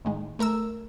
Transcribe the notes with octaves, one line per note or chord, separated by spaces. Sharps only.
A2 D#3 G#3
A3 A#4 A#5 E6